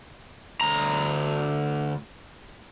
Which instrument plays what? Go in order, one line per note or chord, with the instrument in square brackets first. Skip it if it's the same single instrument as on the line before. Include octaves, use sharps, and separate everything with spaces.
[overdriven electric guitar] D2 A#5